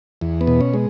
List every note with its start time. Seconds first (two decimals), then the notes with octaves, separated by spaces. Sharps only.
0.21 E2
0.41 B3
0.47 B2
0.61 C#4
0.74 G#3